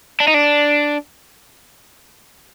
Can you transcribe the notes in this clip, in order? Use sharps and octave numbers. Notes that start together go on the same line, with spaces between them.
D4
D#4
D4